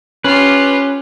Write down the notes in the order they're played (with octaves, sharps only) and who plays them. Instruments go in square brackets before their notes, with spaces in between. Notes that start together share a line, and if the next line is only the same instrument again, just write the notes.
[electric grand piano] C#4 [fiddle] F4 G4 [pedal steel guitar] B4